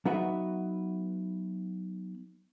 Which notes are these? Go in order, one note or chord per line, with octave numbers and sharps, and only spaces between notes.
F#3 B3 D#4 F#4 B4 E5